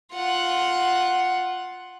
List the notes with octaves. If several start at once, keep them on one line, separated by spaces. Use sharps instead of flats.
F4 F#5